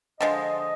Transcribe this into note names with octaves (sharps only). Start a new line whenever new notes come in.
D3 F3 G#3 D#5
D#5